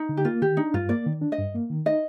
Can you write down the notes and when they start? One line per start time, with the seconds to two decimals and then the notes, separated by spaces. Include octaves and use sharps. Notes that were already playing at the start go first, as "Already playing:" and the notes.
Already playing: D#4
0.09 D3
0.17 G4
0.25 A#3 F4
0.42 D#3 G4
0.57 D4 D#4
0.74 G2 F4
0.89 A#3 D5
1.06 D#3
1.21 D4
1.32 D#5
1.39 G2
1.54 A#3
1.70 D#3
1.86 D#4 D#5